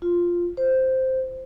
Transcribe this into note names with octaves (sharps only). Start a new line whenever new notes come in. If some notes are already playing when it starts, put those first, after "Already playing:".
F4
C5